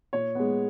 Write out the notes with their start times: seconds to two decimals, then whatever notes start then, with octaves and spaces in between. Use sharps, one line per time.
0.13 A#2 C#5
0.35 G#3 B3